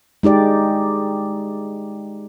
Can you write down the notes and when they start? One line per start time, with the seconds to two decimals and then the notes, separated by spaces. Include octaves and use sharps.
0.23 G#3 D#4 G4 D5